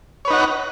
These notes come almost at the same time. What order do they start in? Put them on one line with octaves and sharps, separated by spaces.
C#5 B4 D#4 F#5